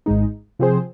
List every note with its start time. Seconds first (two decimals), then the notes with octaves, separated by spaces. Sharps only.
0.06 G#1 G#2 G#3 D#4
0.59 C3 F3 C4 G#4 C5